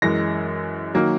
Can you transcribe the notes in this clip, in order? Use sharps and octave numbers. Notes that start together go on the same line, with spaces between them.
F#2 E3 G#3 A#6
D#3 F#3 A#3